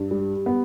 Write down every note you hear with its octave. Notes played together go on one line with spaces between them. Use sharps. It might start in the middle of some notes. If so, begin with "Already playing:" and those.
Already playing: G2
G3
B3